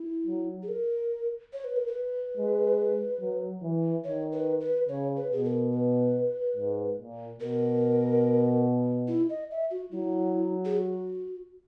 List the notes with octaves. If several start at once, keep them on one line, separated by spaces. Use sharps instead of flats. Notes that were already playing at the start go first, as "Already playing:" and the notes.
Already playing: E4
F#3
G#4
A#4
C#5
B4
A#4
B4
G#3
F#3
E3
D#3 C#5
B4
B4
C#3 C#5
B4
B2 G#4
A#4
B4
G#2
A#2
B2 A#4
E4
D#5
E5
F#4
F#3 E4
G#4
F#4